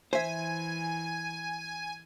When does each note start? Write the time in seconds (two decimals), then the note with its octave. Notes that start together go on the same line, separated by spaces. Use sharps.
0.13 E3 C5 E5 G#5